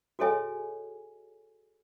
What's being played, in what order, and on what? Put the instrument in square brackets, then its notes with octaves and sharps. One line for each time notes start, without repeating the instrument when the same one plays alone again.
[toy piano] F#4 G#4 A4 C#5 D#5 G#5